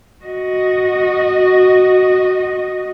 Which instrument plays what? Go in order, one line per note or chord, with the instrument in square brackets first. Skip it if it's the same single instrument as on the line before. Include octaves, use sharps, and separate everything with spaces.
[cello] F#4 D#5